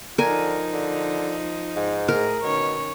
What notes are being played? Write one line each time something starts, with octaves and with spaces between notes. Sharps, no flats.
D3 F3 D#4 A#4 G#5
D3
G#2
A2 G#4 A#4
B2 D#3 C#4 C#5